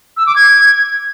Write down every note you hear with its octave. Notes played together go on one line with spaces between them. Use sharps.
E6
D6
G#6